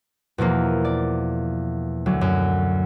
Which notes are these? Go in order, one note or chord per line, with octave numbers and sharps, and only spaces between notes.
E2 B2 F3 A#3
D5
D2 F#3
F#2